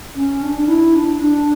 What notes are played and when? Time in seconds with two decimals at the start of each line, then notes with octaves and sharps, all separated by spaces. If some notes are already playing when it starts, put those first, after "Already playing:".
0.15 C#4
0.42 D4
0.58 D4
0.68 E4
0.95 D4
1.21 D4